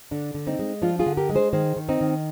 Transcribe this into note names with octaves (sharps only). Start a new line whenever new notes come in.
D3 D4
D3
C4 D#4
G#3
F3 D4 F4
F4 G#4
D3
G4 A#4
G#3
G#4 C5
D#3 G#4 C5
D#3
C4 D#4
D#3